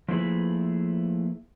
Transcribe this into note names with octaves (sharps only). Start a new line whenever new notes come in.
F3 A3 A#3 E4 G#4 B4